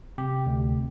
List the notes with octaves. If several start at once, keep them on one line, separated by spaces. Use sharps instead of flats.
C3 G4
D2